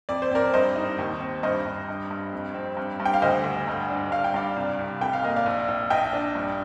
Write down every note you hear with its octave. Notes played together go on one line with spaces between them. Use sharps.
F2 D5
C5
C4 A#4 D5
G2 C5 D#5
D#4
D#2
C4
G2 C5 D#5
G2
G2
G2
F2
C4
G2
G2
G5
F5
D2 C5 D#5
D2
G2
D4
G2 F5
G5
G2 D5 F5
C2
C2
F1 G5
F5
A#3 D#5
D5 F5
A#1
A#1
A#1 D#5 G5
D4
G2